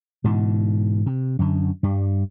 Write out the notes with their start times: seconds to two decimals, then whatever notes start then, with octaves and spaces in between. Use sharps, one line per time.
0.24 G#2 B2 D3 E3
1.06 C3
1.39 F#2 D3
1.83 G2 G3